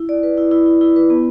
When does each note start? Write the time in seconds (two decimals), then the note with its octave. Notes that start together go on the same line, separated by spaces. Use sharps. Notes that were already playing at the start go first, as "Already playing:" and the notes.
Already playing: E4
0.09 D5
0.23 B4
0.38 E4
0.51 E4
0.66 E4
0.81 E4
0.96 B4
1.10 B3